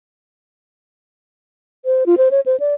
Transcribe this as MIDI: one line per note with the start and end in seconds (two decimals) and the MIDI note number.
1.85 2.04 72
2.06 2.15 65
2.18 2.29 72
2.31 2.40 73
2.46 2.56 72
2.60 2.74 74